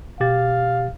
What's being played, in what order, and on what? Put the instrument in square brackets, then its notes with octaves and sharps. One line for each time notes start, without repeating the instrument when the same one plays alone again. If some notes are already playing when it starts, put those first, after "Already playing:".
[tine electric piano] B2 G4 A6 [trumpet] F5